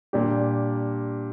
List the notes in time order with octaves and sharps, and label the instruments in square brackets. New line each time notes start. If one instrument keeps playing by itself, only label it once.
[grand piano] A#2 G3 D4 G4